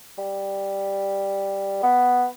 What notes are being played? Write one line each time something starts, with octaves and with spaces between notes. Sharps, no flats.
G3
B3